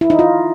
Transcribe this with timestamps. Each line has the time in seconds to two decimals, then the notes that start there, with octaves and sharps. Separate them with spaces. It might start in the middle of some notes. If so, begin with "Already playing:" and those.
0.01 E4
0.10 D#4
0.19 F4